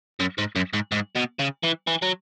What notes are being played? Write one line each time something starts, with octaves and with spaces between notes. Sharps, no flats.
F#2
G#2
F#2
G#2
G#2
B2
C#3
E3
E3
F#3